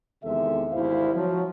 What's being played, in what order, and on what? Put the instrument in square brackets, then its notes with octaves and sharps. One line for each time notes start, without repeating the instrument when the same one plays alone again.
[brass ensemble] E2 C3 D#3 G#3 A4 E5
G#1 D2 C3 E4 C5 F5
F3 F#3